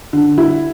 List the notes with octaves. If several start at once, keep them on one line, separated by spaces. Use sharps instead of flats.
D3
E4